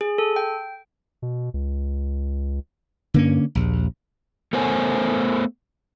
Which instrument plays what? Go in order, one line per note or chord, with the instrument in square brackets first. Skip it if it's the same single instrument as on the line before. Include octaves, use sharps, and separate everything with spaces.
[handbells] G#4
A4
G5
[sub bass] B2
C#2
[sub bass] G2 [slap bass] D3 A#3 C#4
[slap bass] A#1 [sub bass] D#2
[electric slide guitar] A3 B3 A#4 C5 C#5 G#5